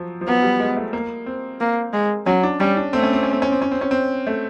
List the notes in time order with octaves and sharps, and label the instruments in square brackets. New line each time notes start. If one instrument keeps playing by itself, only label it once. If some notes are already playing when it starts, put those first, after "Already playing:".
Already playing: [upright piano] F3 F#3
F3
[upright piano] F#3 [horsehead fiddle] B3
[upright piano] G3
G#3
A3
A#3
C4
[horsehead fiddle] A#3
G#3
[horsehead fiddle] F#3 [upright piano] C#4
[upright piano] D4
[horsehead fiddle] G3 [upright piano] C#4
[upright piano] D4
[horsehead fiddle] A3 [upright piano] C4
[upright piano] C#4
C4
C#4
C4
C#4
C4
C#4
C4
C#4
C4
A3